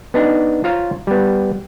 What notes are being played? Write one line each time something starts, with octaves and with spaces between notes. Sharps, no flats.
B3 D4 D#4
F4 C5 C#5 F5 A#5
G3 B3